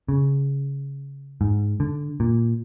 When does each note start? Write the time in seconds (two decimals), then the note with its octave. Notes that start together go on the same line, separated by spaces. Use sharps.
0.08 C#3
1.41 G#2
1.80 D3
2.20 A#2